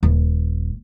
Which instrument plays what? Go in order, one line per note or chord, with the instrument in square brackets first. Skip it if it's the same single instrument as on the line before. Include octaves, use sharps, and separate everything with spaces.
[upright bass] D#1